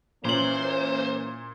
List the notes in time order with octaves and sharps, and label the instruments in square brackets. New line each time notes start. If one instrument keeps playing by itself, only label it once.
[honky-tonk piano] A#2 F#7 [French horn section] E3 A#3 C#4 [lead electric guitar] C5